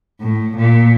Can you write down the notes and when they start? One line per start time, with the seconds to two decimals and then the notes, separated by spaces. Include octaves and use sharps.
0.21 A2
0.57 A#2